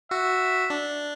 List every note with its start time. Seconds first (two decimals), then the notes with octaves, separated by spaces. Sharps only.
0.11 F#4 E5
0.70 D4